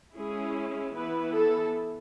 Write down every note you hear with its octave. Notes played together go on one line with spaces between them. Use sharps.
G#3 C#4 E4 G#4
E3 B3 E4 B4
A4